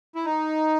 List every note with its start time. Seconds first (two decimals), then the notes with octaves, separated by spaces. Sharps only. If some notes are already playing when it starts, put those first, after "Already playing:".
0.15 E4
0.25 D#4